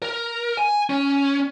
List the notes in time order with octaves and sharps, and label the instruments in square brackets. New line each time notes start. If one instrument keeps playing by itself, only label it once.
[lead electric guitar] A#4
G#5
C#4